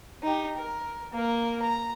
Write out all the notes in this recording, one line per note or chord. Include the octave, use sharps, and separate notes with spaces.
D#4 G4
A#4
A#3 A#4
A#5